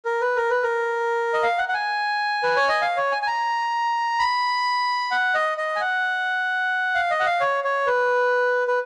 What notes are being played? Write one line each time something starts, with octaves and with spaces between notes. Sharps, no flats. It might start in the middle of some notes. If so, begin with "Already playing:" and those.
A#4
B4
A#4
B4
A#4
D#5
F5
F#5
F#5
G#5
B4
C#5
D#5
F5
C#5
G#5
G#5
A#5
B5
F#5
D#5
D#5
G#5
F#5
F5
D#5
F#5
F5
C#5
C#5
B4
B4